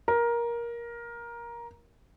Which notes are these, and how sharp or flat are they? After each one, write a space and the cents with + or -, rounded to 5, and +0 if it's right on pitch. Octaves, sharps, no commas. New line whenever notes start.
A#4 +15